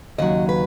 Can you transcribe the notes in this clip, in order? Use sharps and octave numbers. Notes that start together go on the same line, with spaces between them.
D#2 C#3 F#3 D#5
B4